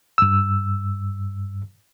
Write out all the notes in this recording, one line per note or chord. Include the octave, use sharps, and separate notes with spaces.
G2 E6